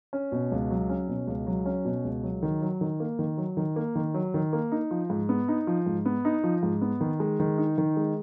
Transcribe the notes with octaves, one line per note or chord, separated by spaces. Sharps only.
C#4
B2
C#2
F#3
C#4
B2
C#2
F#3
C#4
B2
C#2
F#3
D#3
F#3
D#3
A#3
D#3
F#3
D#3
A#3
D#3
F#3
D#3
A#3
D#4
F3
G#2
B3
D#4
F3
G#2
B3
D#4
F3
G#2
B3
D#3
G#3
D#3
D#4
D#3
G#3